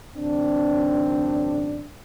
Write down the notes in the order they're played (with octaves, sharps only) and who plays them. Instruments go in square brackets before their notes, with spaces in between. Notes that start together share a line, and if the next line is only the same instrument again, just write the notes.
[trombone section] G#1 F#2 C#3 C4 D4